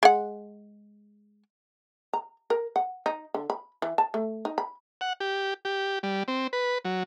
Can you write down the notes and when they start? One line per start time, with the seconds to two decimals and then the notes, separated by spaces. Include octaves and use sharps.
0.03 G#3 F#5
2.13 A#5
2.50 A#4
2.76 F#5
3.06 D#4
3.34 D3
3.50 B5
3.82 E3
3.98 A5
4.14 A3
4.45 D#4
4.58 B5
5.01 F#5
5.20 G4
5.65 G4
6.03 G3
6.28 C4
6.53 B4
6.85 F#3